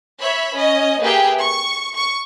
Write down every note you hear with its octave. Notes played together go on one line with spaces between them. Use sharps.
C#5 E5 B5
C#4 D#5
A#3 G4 G#4 B4 E5 G5
C#6
C#6